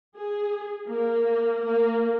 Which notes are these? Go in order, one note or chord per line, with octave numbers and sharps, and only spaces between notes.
G#4
A#3
A#3